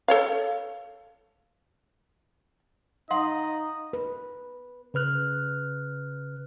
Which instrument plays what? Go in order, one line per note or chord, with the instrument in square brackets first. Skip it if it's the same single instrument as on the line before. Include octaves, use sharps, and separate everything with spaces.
[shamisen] A4 C#5 F5
[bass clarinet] D#4 [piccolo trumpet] D#5 [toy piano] F5 F#5 C6
[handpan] B4
[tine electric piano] C#3 B4 F6 F#6